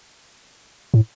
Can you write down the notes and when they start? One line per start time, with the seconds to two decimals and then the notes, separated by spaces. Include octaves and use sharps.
0.94 A2